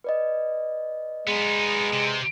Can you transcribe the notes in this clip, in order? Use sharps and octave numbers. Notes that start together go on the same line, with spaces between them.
B4 D5 D#5
G#3 B3 D#4
C3